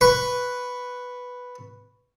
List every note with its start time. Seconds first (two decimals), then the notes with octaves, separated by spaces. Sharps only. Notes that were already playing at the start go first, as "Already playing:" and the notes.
0.01 B4 C#6